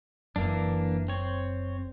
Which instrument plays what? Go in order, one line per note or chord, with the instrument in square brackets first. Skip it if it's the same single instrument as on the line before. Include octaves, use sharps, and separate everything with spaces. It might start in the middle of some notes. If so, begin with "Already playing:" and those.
[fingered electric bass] F#1 F#2 F#3 [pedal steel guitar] E3 A#3 D4
[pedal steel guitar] C4 C#5